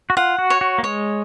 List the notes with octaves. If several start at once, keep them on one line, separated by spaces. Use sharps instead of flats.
F#4
F4 F#5
F#4
C#5
F#4
A#3
G#3 C#5